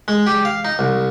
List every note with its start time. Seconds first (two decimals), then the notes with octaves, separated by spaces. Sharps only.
0.08 G#3
0.27 G4
0.45 F5
0.65 D#4
0.79 C2